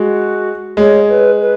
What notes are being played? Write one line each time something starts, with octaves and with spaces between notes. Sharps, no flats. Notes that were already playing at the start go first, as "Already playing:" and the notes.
Already playing: G#3 F#4
G#3 C#5
B4
B4